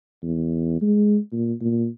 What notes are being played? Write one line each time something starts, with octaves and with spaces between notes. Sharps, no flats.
E2
G#3
A#2
A#2